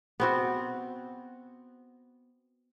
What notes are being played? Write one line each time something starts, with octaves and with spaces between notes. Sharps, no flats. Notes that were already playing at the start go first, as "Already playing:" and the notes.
B3 C4 F#4